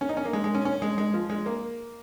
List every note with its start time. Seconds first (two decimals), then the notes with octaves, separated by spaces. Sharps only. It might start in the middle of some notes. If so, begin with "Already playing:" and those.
0.01 C#4
0.09 D#4
0.17 C#4
0.25 A#3
0.33 G#3
0.44 G#3
0.55 C#4
0.65 C#4
0.82 G#3
0.98 G#3
1.14 F3
1.30 G#3
1.46 A#3